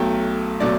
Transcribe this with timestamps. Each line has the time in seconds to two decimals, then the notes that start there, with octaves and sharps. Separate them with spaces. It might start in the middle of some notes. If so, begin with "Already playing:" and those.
Already playing: B1 B2 F#3 A3 G5
0.60 B2 F#3 A3 D5